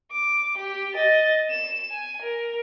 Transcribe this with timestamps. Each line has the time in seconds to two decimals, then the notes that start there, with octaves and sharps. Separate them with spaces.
0.12 D6
0.58 G4
0.94 D#5 A6
1.50 E7
1.91 G#5
2.22 A#4